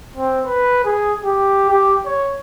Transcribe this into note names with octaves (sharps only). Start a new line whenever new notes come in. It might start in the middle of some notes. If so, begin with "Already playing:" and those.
C4
B4
G#4
G4
G4
C#5